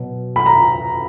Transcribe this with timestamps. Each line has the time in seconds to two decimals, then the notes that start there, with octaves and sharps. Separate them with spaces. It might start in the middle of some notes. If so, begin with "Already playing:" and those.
Already playing: B2 F#3
0.36 B5
0.46 A#5